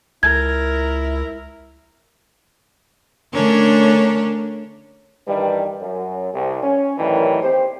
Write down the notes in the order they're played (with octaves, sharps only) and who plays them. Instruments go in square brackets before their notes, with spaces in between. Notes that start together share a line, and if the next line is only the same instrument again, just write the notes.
[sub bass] C#2 [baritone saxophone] E4 [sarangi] A#4 [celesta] G#6
[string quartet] D3 A3 C#4 D4 A#4 C#5
[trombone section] G2 D#3 E3 G3
F#2
C2
C#4
F#2 A2 D#3 E3 G3 C#4
D#2 C4 G4 C5